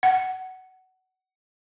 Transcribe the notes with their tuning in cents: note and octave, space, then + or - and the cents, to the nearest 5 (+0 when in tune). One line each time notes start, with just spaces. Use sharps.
F#5 +20